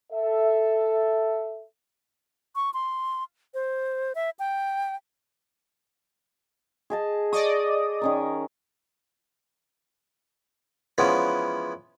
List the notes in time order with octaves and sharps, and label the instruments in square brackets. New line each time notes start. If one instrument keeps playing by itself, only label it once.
[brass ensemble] A4 E5
[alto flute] C#6
C6
C5
E5
G5
[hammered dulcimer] G#4 D#5 A5
[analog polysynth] D5 D#5 D#6 [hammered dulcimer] C#6
[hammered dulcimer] D#3 C#4 A#4
[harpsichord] E3 F3 G#3 B3 C#4